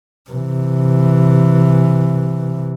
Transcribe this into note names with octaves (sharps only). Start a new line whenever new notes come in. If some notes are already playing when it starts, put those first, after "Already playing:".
C3 E3